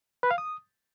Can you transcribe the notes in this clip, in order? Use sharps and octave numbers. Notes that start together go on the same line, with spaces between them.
B4
F5
D#6